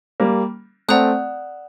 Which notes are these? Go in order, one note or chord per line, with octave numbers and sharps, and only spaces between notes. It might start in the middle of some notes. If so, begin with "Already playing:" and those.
G3 A#3
A3 C4 D5 F#5 A#5 D#6 F#6